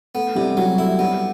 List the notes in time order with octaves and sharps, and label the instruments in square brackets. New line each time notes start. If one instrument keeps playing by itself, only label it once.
[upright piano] A3 [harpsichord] B3
[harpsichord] C3 [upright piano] G3
[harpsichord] F#3 [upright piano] G3
[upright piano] A3 [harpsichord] E4
[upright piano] G3 [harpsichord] B3